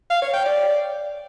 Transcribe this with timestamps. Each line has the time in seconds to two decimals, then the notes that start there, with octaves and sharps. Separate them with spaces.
0.10 F5
0.22 C#5
0.34 G5
0.45 D5